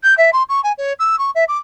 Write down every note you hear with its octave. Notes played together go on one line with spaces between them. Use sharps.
G6
E5
C6
C#6
G#5
C#5
E6
C#6
E5
D6